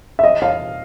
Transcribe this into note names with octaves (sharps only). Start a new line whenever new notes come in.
E5
D#5
F5